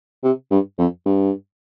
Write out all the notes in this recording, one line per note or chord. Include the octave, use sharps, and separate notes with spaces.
C3
G2
F2
G2